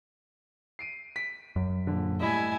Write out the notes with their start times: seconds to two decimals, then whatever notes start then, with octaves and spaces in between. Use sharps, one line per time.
0.79 C7 D7 D#7
1.16 B6 D7
1.56 F#2
1.87 A#1 D3
2.20 A2 G3 E4 D#5 G#5